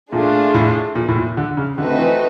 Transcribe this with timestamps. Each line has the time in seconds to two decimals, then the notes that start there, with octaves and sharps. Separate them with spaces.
0.12 A#2 A3 D4 F4 G#4
0.54 A2
0.95 A#2
1.08 A2
1.16 A#2
1.37 D3
1.57 C#3
1.78 D3 A3 C4 D#4 F#4 B4
1.99 E3